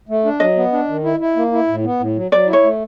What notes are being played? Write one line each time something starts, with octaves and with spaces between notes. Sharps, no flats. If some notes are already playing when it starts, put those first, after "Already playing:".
A3
D4
F#3 D#5
B3
D4
D#3
E4
E4
A#3
E4
A2
B3
A2
F#3
F#3 D5
E4
C#5
A3